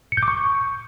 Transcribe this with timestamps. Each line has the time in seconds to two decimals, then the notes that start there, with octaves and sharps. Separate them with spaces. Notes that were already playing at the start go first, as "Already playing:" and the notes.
0.12 C#7
0.17 G6
0.23 D6
0.28 C#6